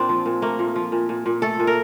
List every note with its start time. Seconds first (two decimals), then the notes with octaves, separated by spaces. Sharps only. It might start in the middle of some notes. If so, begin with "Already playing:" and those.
Already playing: A#2 C4 D4
0.09 F3
0.26 A#2
0.42 A3 A#3
0.59 A#2
0.76 F3
0.92 A#2
1.09 A#2
1.26 A#2
1.42 A3 A4
1.60 A#2
1.67 A#4